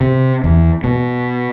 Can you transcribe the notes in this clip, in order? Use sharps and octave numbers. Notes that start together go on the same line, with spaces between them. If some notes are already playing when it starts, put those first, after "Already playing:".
C3
E2
B2